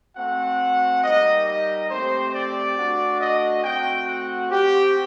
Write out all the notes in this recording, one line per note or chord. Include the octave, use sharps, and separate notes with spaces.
A3 C4 F#4 F#5
G3 A#3 D#4 G4 D#5
D#5
A3 C4 G4 C5
D5
A3 D4 F#4
D#5
A3 C4 F#4 G5
F#5
C4 F#4 G4